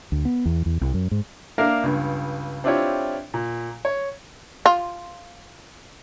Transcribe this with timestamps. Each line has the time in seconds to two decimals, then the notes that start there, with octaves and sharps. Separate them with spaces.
0.12 D2
0.25 B3
0.46 E2
0.66 E2
0.81 C2
0.94 F#2
1.11 G#2
1.58 A#3 D4 A#4 E5 F5
1.83 C#2 G2
2.64 C4 D4 E4 F4 G4 C#5
3.34 A#2
3.85 C#5
4.66 F4